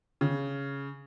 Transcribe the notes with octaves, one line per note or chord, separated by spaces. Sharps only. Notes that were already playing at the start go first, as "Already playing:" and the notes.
C#3